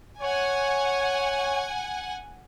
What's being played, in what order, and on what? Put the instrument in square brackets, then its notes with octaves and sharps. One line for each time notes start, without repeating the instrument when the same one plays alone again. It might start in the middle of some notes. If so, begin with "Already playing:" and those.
[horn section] C#5 [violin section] F#5 G#5